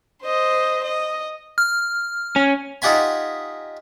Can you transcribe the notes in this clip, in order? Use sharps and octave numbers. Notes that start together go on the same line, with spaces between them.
C5 D#5
D#5
F6
C#4
D#4 F4 G4 F#5 G#5 B5